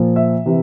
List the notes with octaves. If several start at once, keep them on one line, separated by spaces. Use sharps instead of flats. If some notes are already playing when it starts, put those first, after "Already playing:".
Already playing: A#2 F3
E5
C3 E3